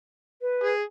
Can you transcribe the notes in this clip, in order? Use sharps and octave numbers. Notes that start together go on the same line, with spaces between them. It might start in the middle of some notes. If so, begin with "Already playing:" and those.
B4
G#4